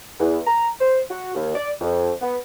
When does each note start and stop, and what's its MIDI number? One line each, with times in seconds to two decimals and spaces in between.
0.20 0.39 40
0.47 0.69 82
0.81 1.01 72
1.11 1.33 66
1.35 1.55 39
1.56 1.71 74
1.81 2.12 41
2.22 2.37 59